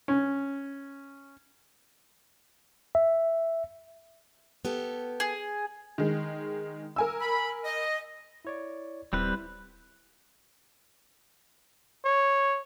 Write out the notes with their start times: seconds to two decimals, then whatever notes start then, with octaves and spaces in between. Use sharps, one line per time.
0.08 C#4
2.95 E5
4.65 B3 G4 A4
5.20 G#4
5.98 D#3 G#3
6.96 A#4 G#5 E6
7.21 B5
7.65 D#5
8.45 E4 C#5 D5
9.13 D#1 G3 C4 E4 B4
12.05 C#5